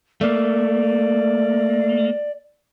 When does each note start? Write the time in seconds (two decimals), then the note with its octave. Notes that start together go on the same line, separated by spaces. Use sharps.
0.21 A3 A#3 D5